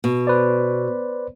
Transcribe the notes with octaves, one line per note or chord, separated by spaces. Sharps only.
B2
B4 C5 D5